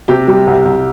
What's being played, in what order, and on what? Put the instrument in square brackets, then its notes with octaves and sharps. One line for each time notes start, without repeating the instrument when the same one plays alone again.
[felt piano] C3 [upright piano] G4
[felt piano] G3
C2
C2